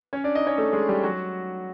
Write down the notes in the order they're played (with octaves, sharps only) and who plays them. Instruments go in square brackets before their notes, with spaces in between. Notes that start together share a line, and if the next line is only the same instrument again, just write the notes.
[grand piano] C#4 C#5
D4 D5
D#4 D#5
C#4 C#5
A3 A4
G#3 G#4
G3 G4
F#3 F#4